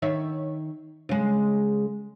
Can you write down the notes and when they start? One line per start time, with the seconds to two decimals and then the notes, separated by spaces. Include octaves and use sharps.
0.02 D#3 C#5 E5
1.09 C#3 G#3